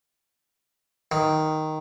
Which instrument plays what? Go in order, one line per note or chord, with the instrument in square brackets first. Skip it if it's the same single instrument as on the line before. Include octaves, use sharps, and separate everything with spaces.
[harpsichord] D#3